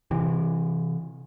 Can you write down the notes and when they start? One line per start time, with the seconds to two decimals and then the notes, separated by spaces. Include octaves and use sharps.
0.11 C3 E3